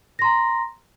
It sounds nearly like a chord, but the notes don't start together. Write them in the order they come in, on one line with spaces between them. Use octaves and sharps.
A#6 C6 A#5